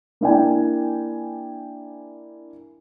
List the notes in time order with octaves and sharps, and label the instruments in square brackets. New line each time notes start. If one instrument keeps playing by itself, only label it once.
[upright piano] A#3 D4 E4 D5 G5 G#5